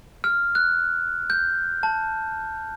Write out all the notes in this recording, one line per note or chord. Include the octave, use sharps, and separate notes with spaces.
F6
F#6
G6
A5